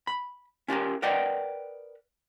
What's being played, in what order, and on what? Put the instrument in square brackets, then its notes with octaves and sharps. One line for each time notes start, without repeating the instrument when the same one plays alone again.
[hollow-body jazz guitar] B5
C#4 F4 G4 A#4
A#4 B4 D5 D#5 F#5 G5